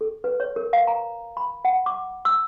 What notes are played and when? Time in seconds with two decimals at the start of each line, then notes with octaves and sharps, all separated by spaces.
0.01 A4
0.24 B4
0.40 C#5
0.56 A#4
0.73 F5
0.87 A#5
1.37 B5
1.65 F#5
1.86 D6
2.25 E6